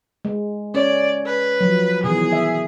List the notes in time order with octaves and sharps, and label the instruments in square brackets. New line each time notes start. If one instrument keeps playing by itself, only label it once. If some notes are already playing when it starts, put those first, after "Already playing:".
[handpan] G#3
[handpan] C#4 C#5 [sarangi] D5
[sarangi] B4
[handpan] F3 F#3
[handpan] B2 D#3 E3 [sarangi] G#4
[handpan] E5